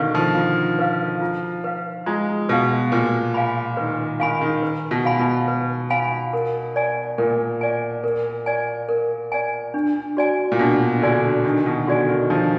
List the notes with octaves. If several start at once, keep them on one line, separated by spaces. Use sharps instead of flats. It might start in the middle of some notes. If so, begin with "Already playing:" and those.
Already playing: B2 D3 D#3 B4 F5
F3
F4
B4 F5
F4
B4 F5
G#3 F4
B2 B4 F5
A#2 B4
F5 G#5 B5
D#3 B4
D#3 F5 G#5 B5
D#3
B4
B2
F5 G#5 B5
B2
B4
F5 G#5 B5
A#4
D5 G#5
A#2 A#4
D5 G#5
A#4
D5 G#5
A#4
D5 G#5
D4
F#4 D5 G#5
A#2
B2 D4
D3 F#4 D5 G#5
D#3 D4
B2
D3 F#4 D5 G#5
D#3
F3 D4